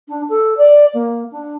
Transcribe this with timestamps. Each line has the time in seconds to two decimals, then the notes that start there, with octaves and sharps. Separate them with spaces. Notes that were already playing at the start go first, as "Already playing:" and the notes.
0.08 D4
0.29 A4
0.57 D5
0.94 A#3
1.32 D4